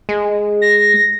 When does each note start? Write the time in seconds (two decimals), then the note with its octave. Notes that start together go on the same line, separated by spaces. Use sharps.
0.09 G#3
0.62 A#6